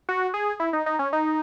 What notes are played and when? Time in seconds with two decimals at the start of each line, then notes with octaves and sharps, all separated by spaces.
0.09 F#4
0.34 G#4
0.60 E4
0.73 D#4
0.86 D#4
0.99 C#4
1.13 D#4